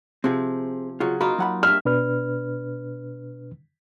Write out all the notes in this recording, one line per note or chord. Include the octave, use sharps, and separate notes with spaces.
C3 F3 C4 G#4
C#3 F#3 F4
A#3 D#4 F4 F#4 B5
F#3 F#5 B5
G2 E5 F6
B2 D4 B4 F6